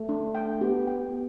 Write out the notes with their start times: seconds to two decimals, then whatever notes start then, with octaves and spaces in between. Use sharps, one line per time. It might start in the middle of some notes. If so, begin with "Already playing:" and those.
Already playing: A3
0.09 D4
0.35 G5
0.61 B3 G4
0.87 G5
1.12 G4